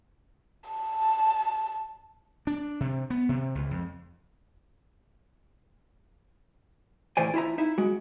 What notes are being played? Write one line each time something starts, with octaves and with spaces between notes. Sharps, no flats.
A5
D4
C3
B3
C3
C#2
F2
A2 E3 C5 D5 G#5
E4 F4 E5 A#5
D#4 E4 E5
G#3 F#4